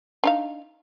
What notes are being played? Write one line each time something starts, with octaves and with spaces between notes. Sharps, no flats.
D4 D#4 F5